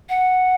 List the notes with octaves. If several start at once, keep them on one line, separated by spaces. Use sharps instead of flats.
F#5